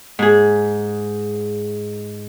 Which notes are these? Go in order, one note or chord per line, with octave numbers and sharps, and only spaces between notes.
G#2 G#4